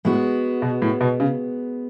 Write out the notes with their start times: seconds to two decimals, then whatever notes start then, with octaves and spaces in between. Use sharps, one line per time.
0.05 A2 G#3 B3 F#4
0.62 B2
0.82 A2
1.01 B2
1.20 C#3